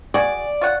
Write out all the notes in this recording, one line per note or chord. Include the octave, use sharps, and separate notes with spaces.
F#4 G#4 D5
F4 C#5 F#5